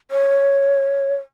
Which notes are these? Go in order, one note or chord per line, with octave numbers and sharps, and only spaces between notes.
C#5